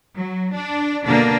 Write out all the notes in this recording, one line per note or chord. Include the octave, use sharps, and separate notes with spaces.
F#3
D4
B2 D3 A#3 D4